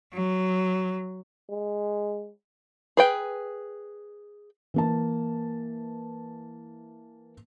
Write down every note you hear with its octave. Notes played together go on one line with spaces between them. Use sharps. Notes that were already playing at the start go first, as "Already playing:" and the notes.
F#3
G#3
G#4 B4 G5
E3 A#3 A5